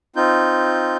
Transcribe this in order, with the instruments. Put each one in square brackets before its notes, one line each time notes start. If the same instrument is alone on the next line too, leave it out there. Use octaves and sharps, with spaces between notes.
[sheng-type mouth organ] C4 D#4 F4 G6